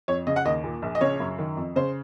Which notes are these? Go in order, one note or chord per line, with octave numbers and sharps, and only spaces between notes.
F2 C#5
C#3 D#5
F#5
D#2 D#5
A#2
A#1
D#5
C#3 C#5
F#2
D#3
F2
C#3 C5